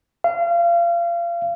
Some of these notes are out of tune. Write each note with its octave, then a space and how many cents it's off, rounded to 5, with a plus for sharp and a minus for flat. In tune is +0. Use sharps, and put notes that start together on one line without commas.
F5 -30